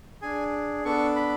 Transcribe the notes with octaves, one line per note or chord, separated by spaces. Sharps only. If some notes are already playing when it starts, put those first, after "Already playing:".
D4 G#4 G#5
B3 D4 A4 C#6
B5